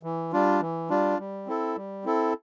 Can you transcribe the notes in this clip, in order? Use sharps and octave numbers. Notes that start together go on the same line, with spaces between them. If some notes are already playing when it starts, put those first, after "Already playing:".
E3
G3 D4 F4
E3
G3 D4 F4
G3
C4 E4 A4
G3
C4 E4 A4